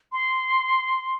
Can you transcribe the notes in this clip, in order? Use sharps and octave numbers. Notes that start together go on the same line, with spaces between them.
C6